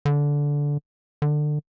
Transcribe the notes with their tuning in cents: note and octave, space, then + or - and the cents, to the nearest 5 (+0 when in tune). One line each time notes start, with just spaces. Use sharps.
D3 -15
D3 +25